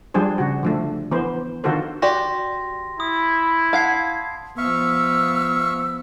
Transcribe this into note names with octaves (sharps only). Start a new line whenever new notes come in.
F3 G3 D4 G#4 C5
C#3 F#4
D3 F3 A3
E3 B3 C5
D3 D#3 F4 F#4 A4 C5
F#4 G4 D5 C6 A#6
E4 D#6
F5 F#5 A5 G#6 C7
F3 B3 E5 F5 C#6 E6